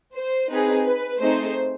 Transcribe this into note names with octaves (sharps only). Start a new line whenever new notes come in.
C5
C4 D#4 G#4 B4
B4
A3 C4 D#4 G#4 C5